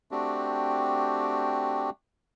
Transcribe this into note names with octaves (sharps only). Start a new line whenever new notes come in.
A3 C4 D4 F#4 G4